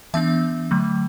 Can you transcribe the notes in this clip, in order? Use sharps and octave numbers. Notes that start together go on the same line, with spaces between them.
E3 B3 D4 E5
D3 F#3 A3